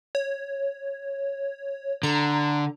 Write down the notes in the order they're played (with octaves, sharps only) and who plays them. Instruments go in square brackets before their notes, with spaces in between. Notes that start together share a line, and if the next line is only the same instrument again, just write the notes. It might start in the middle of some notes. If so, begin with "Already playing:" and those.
[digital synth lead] C#5
[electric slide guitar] D3 [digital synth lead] A#5